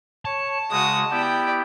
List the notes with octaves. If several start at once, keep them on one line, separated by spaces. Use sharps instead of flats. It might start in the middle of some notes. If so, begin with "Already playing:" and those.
C#5 A5
C#3 G#3 F#4 D#6
B3 E4 G4 D5 G5